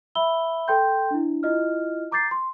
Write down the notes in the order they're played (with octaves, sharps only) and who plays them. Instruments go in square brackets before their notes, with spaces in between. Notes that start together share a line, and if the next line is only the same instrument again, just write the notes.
[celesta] E5 B5 E6 G7
A4 B4 G5 C6 G6
D4 E4
E4 F4 D#5 F6
A#5 D6 G6 A6 C7
C6